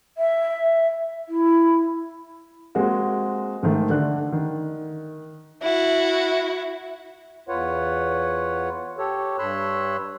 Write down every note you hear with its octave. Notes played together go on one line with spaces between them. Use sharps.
E5
E4
G#3 A#3 C4 F#4
G#2 D#3 A3
D3 D4 F#6
D#3
E4 F#4
E2 F4 B4 C#5 F#5
G4 A4 C#5
G2 C#5 B5 C6 E6 F#6